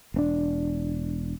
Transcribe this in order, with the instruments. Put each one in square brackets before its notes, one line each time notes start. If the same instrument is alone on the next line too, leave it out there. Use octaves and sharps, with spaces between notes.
[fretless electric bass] E1 C4 D4